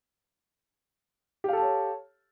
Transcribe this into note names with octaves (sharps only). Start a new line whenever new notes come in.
G4 A4 C#5 F5 A5